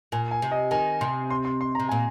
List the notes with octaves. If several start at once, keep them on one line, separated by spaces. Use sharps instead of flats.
A#2 G#5
G#5
C3
D#5
D#3 G#5
C3 C6
C6
C6
C6
A#5
C3
A#2 G#5